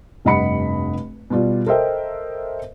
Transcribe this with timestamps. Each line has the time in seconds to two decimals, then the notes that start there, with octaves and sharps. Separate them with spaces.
0.25 F1 G2 D#5 F#5 B5 C#7
1.30 B2 G3 F4 D5
1.66 A4 A#4 C5 D#5 E5 G5